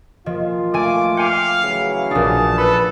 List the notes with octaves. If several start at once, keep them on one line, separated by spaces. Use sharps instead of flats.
A#2 F3 F4 D#5
A3 G#5 D6
F5 G5 G#5 D6 C#7
C#3 E3 F#3
A#1 D4 G#5 A5 D#6
A4 B4 B5